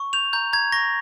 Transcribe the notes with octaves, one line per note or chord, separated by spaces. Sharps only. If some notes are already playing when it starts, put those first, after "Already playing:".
Already playing: C#6
G6 F7
A#5 G6
A#5 G#6
C#6 A#6